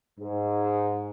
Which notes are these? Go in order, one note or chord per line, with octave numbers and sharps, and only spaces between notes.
G#2